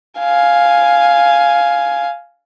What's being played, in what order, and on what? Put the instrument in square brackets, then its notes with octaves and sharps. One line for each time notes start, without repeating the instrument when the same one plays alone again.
[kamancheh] F5 G#5